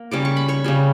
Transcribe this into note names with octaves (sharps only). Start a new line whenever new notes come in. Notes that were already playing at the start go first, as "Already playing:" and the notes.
Already playing: A#3
C#3 G3 C#4 D6
C#6
B5
C#5 C#6
C#3 G3 C#4